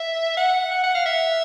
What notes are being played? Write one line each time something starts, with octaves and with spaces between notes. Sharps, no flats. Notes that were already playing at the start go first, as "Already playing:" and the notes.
Already playing: E5
F#5
F#5
F#5
F5
E5